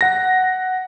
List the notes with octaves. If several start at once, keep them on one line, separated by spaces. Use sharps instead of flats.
F#5 A#6